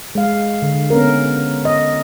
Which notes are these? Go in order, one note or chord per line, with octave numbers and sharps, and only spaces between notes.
G#3 F5
D3
B3 C#4 A#4
D#5